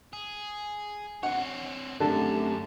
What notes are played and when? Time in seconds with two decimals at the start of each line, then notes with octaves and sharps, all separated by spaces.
0.13 G#4
1.23 C4 C#5 F#5
2.00 F#2 D3 A3 C4 G4 A5